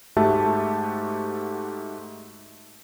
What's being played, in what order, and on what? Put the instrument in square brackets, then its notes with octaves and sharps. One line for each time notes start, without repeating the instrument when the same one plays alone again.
[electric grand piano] G#2 A3 F#4 G4 E5 A5